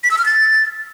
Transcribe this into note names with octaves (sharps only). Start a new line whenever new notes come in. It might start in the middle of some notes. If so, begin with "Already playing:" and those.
B6
E6
F6
A6